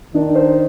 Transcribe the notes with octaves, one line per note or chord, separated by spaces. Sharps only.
D#3 D4
C5